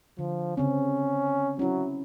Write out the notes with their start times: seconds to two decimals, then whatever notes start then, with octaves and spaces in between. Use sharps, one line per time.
0.19 D3 F3
0.57 C#3 C4 C#4
1.59 F#3 C#4 E4